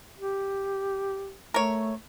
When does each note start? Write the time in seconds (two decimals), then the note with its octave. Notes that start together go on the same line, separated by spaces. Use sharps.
0.19 G4
1.54 A3 A#4 C#5